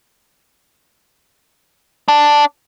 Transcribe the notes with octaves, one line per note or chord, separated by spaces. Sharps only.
D4